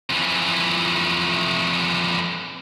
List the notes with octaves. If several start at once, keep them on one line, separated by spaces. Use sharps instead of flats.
F2 E3